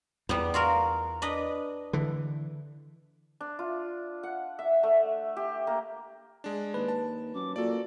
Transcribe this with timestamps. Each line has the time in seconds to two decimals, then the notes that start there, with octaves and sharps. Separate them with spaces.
0.29 E2 G3 B3
0.54 F4 F#4 A#4
1.22 D4 B4 D#5
1.93 D3 E3
3.41 D4
3.59 F4
4.23 F#5
4.59 E5
4.83 A3
5.37 G4
5.67 A#3
6.44 G#3 D4
6.74 D#2 B4
6.88 A5
7.34 F#2 D6
7.56 A#2 F#4 A4 D5